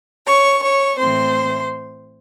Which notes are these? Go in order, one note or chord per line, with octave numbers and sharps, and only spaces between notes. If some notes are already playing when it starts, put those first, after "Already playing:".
C#5 C#6
C#5 C#6
A2 E3 A3 C4 C5 C6